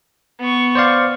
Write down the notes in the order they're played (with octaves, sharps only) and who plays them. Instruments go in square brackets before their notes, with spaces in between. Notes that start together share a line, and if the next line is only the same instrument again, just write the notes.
[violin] B3 C#6
[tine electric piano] C5 D5 F5